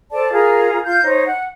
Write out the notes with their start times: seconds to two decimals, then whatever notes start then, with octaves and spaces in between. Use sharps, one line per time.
0.12 A4 C5 D5 A5
0.33 F4 G#4 A#4 A#5
0.85 F4 G6
1.03 D#4 C5 C#5
1.26 F#5